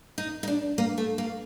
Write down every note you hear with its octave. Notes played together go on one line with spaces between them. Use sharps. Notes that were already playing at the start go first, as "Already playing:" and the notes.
D#4
D#4
D4
A#3
A3
A#3